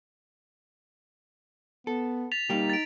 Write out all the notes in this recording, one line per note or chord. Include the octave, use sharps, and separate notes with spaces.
B3 A4
A6 B6 F7
G3 A#3 D#4 G4
A6 D7